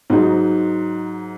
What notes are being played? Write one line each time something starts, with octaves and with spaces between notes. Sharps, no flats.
G#2 F#3 D#4